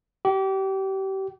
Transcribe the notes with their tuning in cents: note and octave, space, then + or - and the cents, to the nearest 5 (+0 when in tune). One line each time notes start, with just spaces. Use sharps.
G4 -30